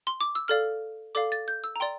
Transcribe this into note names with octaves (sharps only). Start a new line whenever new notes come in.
C6
D6
E6
A4 D5 F5 F6
A4 D5 F5 D6
A6
G6
E6
A#5
D5 G5 C6